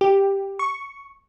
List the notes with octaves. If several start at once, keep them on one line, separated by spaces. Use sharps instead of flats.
G4
C#6